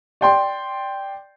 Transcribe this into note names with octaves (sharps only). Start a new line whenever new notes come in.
D5 G5 C6